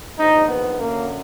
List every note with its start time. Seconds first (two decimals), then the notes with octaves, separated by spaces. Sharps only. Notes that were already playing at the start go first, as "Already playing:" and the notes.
0.17 A#1 G#2 D#3 D#4
0.48 B3
0.78 F#2 D3 F#3 A#3